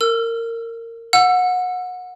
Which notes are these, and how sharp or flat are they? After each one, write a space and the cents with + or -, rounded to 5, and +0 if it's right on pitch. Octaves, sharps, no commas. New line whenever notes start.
A#4 -20 E6 +20
F#5 -25 E6 +20